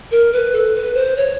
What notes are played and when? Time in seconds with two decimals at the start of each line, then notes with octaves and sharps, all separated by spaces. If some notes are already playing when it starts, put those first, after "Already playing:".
0.11 A#4
0.33 B4
0.53 A4
0.75 B4
0.95 C5
1.17 C#5